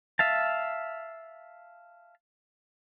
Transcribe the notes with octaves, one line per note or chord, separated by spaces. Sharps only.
E5 F5 A5